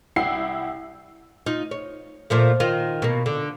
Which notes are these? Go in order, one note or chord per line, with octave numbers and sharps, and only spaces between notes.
C2 E4 F#5 G5 C7
D#4 F4
C#5
A#2 F3 A3
D#3 F4
B2 A#3
D3